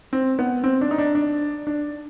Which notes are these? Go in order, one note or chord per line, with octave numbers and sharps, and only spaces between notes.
C4
B3
C4
D4
D#4
D4
D4
D4